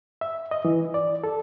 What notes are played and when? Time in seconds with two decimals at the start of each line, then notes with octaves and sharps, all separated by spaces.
0.21 E5
0.51 D#5
0.65 E3
0.94 D5
1.24 A4